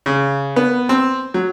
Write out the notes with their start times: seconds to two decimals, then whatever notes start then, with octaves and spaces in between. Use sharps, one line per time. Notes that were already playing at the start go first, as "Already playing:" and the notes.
0.06 C#3
0.56 B3
0.89 C4
1.34 F#3